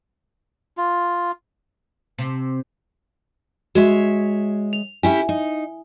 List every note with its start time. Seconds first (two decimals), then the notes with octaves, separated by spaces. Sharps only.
0.77 F4
2.18 C3
3.75 G#3 F#4 C#5 E5
4.73 F7
5.03 C#4 E4 G4 E5 G#5
5.29 D#4